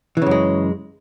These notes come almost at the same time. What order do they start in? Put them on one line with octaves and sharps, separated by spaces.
E3 C#3 F#2 G#3